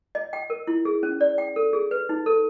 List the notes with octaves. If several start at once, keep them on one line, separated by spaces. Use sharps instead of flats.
D#5
G5
A#4
E4
G#4
C#4
D5
G5
A4
G#4
B4
D#4
A4